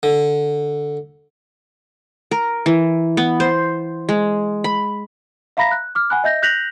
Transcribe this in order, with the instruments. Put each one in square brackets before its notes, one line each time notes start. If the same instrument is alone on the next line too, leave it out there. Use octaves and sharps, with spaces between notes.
[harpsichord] D3
[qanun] A#4
E3
B3
C5
G#3
B5
[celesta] E5 F5 A#5 B5 A#6 B6
F#6
D6 F6
F#5 G#5 B5 F#6
D#5 E5 G6 A#6
F#6 G6 A#6 B6 F7 F#7